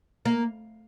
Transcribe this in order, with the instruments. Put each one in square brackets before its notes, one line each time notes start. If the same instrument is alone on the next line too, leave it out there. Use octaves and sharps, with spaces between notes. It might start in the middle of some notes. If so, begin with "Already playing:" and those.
[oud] A#3